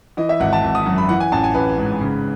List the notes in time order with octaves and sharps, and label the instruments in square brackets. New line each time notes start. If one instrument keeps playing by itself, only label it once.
[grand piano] E3 D#5
E5
G#1 F#5
A5
G#1
D#6
F#2
B5
E3 F#5
G#5
A1 A5
G#5
A1 B4
G#2
C#3